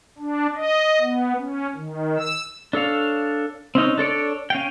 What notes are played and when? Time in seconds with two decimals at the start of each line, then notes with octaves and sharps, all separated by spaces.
0.18 D4
0.56 D#5
1.01 B3
1.37 C#4
1.75 D#3
2.18 E6
2.73 D4 A4 C#5 F5
3.75 C4 C#4 D#4
3.98 D4 A4 C#5 D5
4.50 C#4 F5 G5